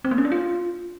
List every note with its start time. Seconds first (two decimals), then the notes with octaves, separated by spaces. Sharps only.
0.05 C4
0.11 A#3
0.18 C#4
0.25 D4
0.32 F4